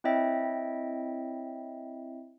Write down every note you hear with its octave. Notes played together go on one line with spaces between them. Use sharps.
C4 E4 C#5 D#5 E5 G5